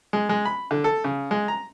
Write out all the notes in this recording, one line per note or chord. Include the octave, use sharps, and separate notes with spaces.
G#3
G#3
B5
D3
A4
C#3
G#3
A#5